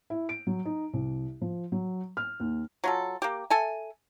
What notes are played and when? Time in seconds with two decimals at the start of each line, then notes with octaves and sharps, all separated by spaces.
0.10 E4
0.29 D7
0.47 F#3
0.65 D#4
0.93 C2
1.41 F3
1.72 F#3
2.17 F6
2.40 D#2
2.84 F#3 F4 A4
3.22 A#3 G4
3.50 A4 E5 G#5